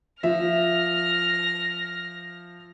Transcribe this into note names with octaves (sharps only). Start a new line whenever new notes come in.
F3 E5 F6 A#6